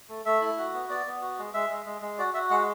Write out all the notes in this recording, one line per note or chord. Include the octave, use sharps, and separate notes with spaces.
A3
A3 E5
E4
F#4
B3
B3 D5
B3
F#4
G#3
G#3 E5
G#3
G#3
G#3
F#4 D5
F#4 E5
G#3 F#5